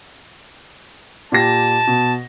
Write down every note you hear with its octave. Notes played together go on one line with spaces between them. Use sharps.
A#2 G4 A5 A#6
B2